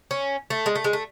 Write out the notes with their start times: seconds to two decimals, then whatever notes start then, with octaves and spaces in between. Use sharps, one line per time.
0.11 C#4
0.50 A3
0.66 G#3
0.75 A3
0.84 G#3
0.93 A3